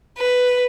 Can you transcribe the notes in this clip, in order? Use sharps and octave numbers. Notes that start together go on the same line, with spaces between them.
B4